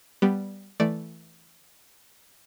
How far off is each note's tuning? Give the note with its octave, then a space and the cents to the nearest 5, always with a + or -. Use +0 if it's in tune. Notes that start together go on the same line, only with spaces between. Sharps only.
G3 +0 B3 +0
E3 +0 A3 +0 D5 +0